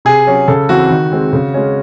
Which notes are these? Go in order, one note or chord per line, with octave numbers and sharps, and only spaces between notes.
C3 G#4
F#3 C#4
C#3 A4
E3 C4 F#4
D#3
G#3 C4
C#3
G#3 C#4